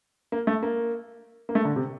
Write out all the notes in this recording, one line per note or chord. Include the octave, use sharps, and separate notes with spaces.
A#3
A3
A#3
A#3
A3
D3
C3